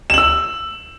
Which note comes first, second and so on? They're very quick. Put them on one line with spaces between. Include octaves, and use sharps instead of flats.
E7 F#7 E6